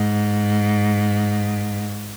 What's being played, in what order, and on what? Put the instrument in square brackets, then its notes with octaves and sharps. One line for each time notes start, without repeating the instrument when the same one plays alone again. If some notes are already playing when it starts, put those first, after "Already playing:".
Already playing: [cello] G#2